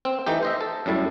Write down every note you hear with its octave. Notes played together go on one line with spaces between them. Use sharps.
C4
E3 A3 D#4 G4
C5 D#5 E5
A4
F#2 A2 G3 E4 A5